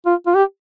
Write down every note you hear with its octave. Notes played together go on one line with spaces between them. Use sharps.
F4
F4
G4